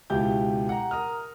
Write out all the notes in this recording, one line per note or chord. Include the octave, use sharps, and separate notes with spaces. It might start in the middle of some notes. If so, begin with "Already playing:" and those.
C#2 B2 E4 G4 G6
F#5 A#5
A#4 A#5 D#6 F6